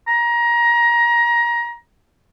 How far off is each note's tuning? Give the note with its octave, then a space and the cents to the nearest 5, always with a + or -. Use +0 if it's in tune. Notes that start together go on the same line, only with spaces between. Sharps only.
A#5 +25